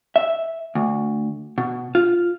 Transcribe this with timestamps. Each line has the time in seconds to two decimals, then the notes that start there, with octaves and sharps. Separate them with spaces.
0.16 E5
0.75 D2
1.58 B2
1.95 F4